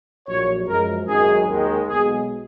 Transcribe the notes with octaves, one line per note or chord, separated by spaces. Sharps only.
A#1 A#2 F#3 C#5
F#2 F3 G#3 A#4
G#1 F#2 D#3 F#3 G#4
D#2 D#3 G#3
B1 B2 G#3 G#4